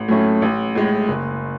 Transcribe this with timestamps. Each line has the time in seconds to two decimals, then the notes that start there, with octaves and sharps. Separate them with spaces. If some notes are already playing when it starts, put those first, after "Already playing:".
Already playing: A1
0.08 A2 F#3 A3 C#4
0.42 A1
0.75 A2 G#3
1.08 F#1